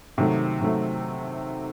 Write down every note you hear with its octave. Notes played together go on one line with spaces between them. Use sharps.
C3 D#3 F#3 A3
C3 D#3 F#3 A3